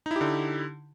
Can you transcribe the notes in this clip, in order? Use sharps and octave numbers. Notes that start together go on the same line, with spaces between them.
D3 D#4 E4 G4